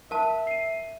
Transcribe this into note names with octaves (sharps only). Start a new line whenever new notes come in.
A#4 E5 A5
C7 D#7